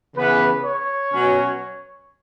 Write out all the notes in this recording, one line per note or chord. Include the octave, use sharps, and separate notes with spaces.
C#3 E3 B3 B4
C#5
B2 F#3 C#4